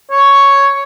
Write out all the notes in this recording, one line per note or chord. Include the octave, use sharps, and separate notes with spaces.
C#5